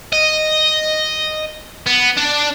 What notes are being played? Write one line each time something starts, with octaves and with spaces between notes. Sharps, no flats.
D#5
B3
D4